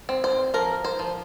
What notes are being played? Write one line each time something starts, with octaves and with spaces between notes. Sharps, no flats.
C4
C5
F3 A#4
C5
F3